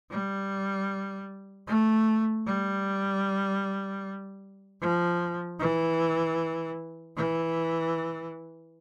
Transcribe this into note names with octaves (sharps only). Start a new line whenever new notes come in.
G3
A3
G3
F3
E3
E3